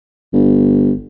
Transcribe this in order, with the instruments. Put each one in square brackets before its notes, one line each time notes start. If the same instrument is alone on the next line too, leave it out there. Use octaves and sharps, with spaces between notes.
[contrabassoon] G1